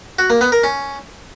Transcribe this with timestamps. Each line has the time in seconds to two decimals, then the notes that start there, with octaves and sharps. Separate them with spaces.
0.19 F#4
0.30 A#3
0.41 B3
0.52 A#4
0.64 C#4